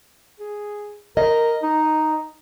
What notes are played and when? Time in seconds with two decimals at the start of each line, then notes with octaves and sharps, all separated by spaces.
0.40 G#4
1.17 A#4 D#5
1.63 D#4